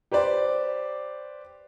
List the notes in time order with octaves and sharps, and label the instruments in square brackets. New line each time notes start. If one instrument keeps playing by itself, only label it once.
[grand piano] G4 B4 C5 D5